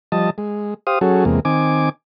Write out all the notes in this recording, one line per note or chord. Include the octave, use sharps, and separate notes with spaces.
F3 G3 D#5 A5
G#3
G4 C5 F5 D#6
F#3 C#4 F#4 G#4 A4
E2 C3 G#3 A#3
D#3 C4 G#5 D6